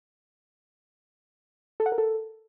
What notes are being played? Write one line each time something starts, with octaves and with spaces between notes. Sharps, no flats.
A4
F#5
A#4
A4